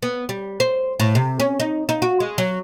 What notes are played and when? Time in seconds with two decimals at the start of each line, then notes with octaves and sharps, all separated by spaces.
0.02 B3
0.29 G3
0.60 C5
1.00 A2
1.15 C3
1.40 C#4
1.60 D#4
1.89 D#4
2.02 F#4
2.20 G#3
2.38 F#3